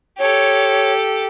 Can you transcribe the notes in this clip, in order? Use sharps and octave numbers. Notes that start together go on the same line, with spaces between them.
G4 A4 C#5